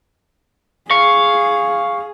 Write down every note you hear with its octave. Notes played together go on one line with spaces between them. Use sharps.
G#4 F5 C#6